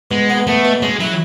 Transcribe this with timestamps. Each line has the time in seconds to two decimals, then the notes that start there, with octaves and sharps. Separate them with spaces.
0.11 B2 G#3
0.30 B3
0.47 A3 B3
0.65 B2
0.82 G#3 C#4
0.99 F#3 E4